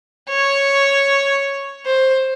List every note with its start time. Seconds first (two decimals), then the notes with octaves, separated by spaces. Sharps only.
0.29 C#5
1.86 C5